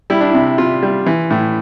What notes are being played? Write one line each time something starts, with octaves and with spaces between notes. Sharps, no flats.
G3 E4
D4
C3 E4
C3 F4
G3
E3
A2